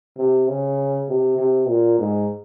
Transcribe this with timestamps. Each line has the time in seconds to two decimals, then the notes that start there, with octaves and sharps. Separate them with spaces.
0.18 C3
0.48 C#3
1.09 C3
1.38 C3
1.68 A#2
1.99 G#2